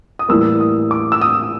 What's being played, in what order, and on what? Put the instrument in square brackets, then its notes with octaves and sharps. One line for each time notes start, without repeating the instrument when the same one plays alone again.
[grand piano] D#6
A2 E3 G3 A#3 E6
D#6
D6
E6
D#6